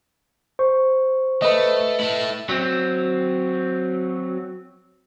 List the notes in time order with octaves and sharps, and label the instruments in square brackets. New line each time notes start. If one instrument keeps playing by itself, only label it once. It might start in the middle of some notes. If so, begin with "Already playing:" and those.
[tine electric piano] C5 C#6
[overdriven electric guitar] A3 [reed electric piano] B4 D#5
[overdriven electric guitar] A3 E4
[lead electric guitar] F#3 C4